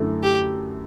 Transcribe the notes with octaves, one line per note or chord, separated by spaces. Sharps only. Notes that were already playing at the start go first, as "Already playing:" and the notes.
Already playing: F#2 D3 A3 E4
G4